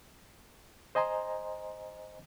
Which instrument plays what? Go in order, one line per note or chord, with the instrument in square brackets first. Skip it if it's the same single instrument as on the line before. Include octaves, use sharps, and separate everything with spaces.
[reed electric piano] C5 D#5 G#5 A#5 C6